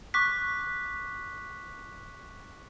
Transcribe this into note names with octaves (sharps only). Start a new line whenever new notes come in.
C#6 D6 F#6 B6